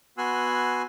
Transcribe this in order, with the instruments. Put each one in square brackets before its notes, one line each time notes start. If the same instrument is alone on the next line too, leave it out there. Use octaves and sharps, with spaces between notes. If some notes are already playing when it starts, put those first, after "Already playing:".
[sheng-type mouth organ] B3 F#4 G#5 C6 E6 F#6